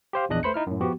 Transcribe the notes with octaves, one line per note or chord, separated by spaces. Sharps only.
G4 C5 F5
A#1 E2 D4 D#5 F#6
A3 B4 C5 B5 G6 C#7
D#4 E4 F6
F#2 A2
F3 B3 F#4 G4